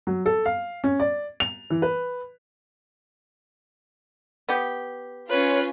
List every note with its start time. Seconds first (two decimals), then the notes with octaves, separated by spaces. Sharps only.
0.07 F#3
0.26 A4
0.46 F5
0.84 C#4
1.00 D5
1.40 F7
1.70 E3
1.82 B4
4.49 B3 G4
5.30 C#4 F4 B4 C#5